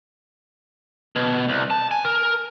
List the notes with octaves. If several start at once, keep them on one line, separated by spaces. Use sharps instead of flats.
B2
C2
A5
G#5
A#4